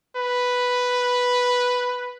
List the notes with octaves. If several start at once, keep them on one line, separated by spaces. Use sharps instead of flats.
B4